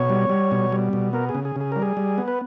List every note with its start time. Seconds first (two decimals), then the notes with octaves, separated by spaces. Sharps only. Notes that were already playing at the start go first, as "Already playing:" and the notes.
Already playing: B2 C#5
0.10 G3
0.29 G3
0.51 B2
0.72 G3
0.93 B2
1.13 B3 A#4
1.29 G#4
1.35 C#3
1.45 G#4
1.56 C#3 G#4
1.72 G3 A#4
1.82 G#4
1.97 G3
2.18 B3
2.28 B4